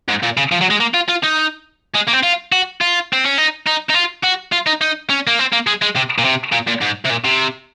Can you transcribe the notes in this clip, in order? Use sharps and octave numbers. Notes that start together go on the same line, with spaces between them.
G#2
A#2
C#3
F3
F#3
G#3
A#3
F4
F4
D#4
G#3
A#3
C4
F4
F#4
F4
C4
C#4
D#4
D#4
D#4
F4
F#4
F4
D#4
D#4
C#4
A#3
C4
A#3
G#3
G#3
C3
A#2
C3
A#2
A#2
G#2
C3
A#2
C3